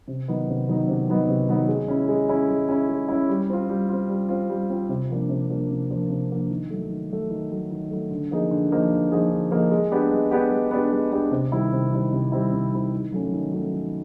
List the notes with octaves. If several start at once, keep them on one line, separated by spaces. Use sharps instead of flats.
C3
D#3 F#3 B3 D#4
C3
D#3 F#3 B3 D#4
C3
D#3 F#3 B3 D#4
C3
D#3 F#3 B3 D#4
G#3
C#4 E4
G#3
C#4 E4
G#3
C#4 E4
G#3
C#4 E4
G3
C4 F4
G3
C4 F4
G3
C4 F4
G3
C4 F4
C3
F3 A#3 D4
C3
F3 A#3 D4
C3
F3 A#3 D4
C3
F3 A#3 D4
D#3
F#3 A3
D#3
F#3 A3
D#3
F#3 A3
D#3
F#3 A3
D3
F3 A#3 D#4 G#4
D3
F3 A#3 D#4 G#4
D3
F3 A#3 D#4 G#4
D3
F3 A#3 D#4 G#4
G#3
B3 D4 G4
G#3
B3 D4 G4
G#3
B3 D4 G4
G#3
B3 D4 G4
C3
D#3 G3 C4 E4
C3
D#3 G3 C4 E4
C3
D#3 G3 C4 E4
C3
D#3 G3 C4 E4
D#3
F#3 A3 C#4
D#3
F#3 A3 C#4
D#3